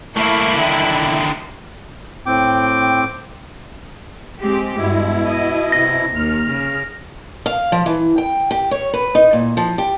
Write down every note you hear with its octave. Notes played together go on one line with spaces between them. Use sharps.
A3 A#3 E4
D3 D#3
A2 C4 G5 D6
G#3 C4 G4
G2 B2 G#3 E4
D#5
C3 A#6
D#2 F6
C#3
F5
F3
E3
G5
G4
C#5
B4
D#4
A#2
F3
G4